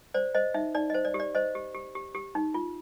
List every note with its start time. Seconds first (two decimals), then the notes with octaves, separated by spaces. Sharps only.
0.14 C5 D5
0.35 C5 D#5
0.54 D#4 E5
0.75 D#4 D5
0.90 C5 D#5
1.05 D5
1.14 G4
1.20 D5
1.35 C5 D#5
1.55 G4
1.74 G4
1.95 G4
2.15 G4
2.35 D#4
2.54 F4